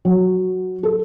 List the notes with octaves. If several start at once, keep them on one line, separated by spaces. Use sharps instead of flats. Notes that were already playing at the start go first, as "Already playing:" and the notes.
F#3
A4